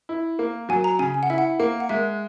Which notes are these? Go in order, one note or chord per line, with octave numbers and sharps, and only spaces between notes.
E4
A#3
F#3 G#5
A#5
C#3 G#5
G#5
F#5
E4 E5
F#5
A#3
F#5
G#3 E5